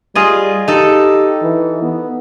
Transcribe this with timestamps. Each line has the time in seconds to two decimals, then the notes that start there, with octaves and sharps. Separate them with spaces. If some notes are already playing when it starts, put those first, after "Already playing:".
0.15 G3 F4 G#4 D#5
0.68 D#4 G4 A4
1.43 E3
1.82 B3